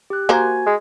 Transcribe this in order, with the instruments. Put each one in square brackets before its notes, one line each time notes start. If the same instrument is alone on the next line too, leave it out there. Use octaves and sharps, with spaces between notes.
[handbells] G4 F#6
[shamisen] A#3 A#4 C5 [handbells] F#4 G#5 G#6
[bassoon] G#3